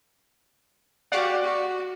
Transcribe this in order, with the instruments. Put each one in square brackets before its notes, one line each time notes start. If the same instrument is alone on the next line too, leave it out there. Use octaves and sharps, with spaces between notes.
[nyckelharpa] F#4 G4 [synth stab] D5 F5 F#5
[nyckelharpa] F#4